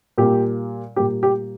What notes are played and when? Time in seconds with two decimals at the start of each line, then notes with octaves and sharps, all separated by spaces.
0.18 A#2 G3 A#3 G4
0.96 A#2 G3 A#3 G4
1.23 G4